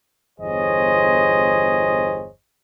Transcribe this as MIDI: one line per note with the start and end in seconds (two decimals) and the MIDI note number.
0.39 2.29 31
0.39 2.29 40
0.39 2.29 68
0.39 2.29 72
0.39 2.29 73
0.39 2.29 75